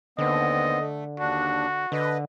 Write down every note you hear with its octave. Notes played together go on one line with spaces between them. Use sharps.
D#2 D3 B3 C4 D#5
A3
D#2 D4 F#4
D3 B4 D#5